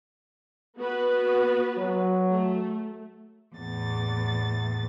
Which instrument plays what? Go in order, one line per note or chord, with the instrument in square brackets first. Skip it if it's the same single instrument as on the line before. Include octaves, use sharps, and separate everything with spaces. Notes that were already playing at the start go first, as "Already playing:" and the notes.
[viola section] B3 F#4 B4
[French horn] F#3
[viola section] A3
[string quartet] E2 A2 A6